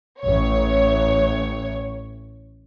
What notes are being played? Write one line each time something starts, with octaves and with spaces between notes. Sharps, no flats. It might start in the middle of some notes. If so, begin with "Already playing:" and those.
A1 C#5